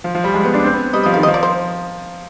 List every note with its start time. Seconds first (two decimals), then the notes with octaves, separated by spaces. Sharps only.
0.04 F3
0.15 F3
0.24 G3
0.34 G#3
0.43 B3
0.54 D4
0.64 C4
0.73 B3
0.93 G3 D#5
1.04 F3 D#5
1.14 D#3 F5
1.23 F3 D#5
1.34 D5
1.43 C5